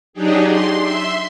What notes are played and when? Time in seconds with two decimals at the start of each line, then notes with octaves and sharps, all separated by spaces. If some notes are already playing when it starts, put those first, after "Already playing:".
0.13 F#3 D4 D#4 G4 G#4
0.46 C6
0.81 E5 C6